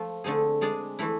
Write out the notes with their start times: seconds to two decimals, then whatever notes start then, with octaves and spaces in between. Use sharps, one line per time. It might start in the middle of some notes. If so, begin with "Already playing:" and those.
Already playing: F3 A3 F4
0.24 D3 A3 C4 G#4
0.61 G#3 D4 G#4 D5
0.99 E3 A3 E4